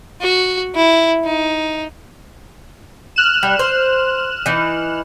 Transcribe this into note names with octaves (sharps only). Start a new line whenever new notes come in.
F#4
E4
D#4
F6 F#6 E7
G3
C5
E3 D#4